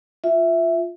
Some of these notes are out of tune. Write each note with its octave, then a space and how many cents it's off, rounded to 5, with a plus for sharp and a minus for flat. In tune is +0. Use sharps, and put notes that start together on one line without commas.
F4 +0 E5 +0